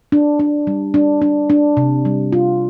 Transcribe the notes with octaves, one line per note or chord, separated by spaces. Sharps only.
D4
D4
G3
D4
D4
D4
C3
G3
F4